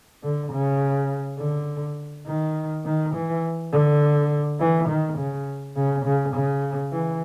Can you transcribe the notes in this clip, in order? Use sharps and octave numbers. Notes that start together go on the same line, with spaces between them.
D3
C#3
D3
D#3
D#3
E3
D3
E3
D#3
C#3
C#3
C#3
C#3
E3